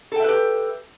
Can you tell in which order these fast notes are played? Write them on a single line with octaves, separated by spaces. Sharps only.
A4 G5 E5 B4 G4